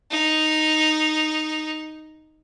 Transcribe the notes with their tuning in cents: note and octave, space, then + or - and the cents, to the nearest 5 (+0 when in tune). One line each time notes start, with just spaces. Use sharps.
D#4 -5